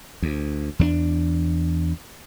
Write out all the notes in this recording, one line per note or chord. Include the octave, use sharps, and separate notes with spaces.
D2
E2 A3 D4